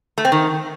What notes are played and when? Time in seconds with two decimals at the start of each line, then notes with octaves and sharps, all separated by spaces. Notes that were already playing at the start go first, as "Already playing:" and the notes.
0.18 A3
0.25 C4
0.32 D#3